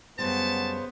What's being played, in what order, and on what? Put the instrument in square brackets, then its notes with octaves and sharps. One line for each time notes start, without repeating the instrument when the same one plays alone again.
[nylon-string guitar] F#2 G3 [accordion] C#3 C5 [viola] B3 [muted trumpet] A5